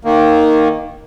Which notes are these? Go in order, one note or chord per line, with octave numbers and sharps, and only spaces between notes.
D#3 A#3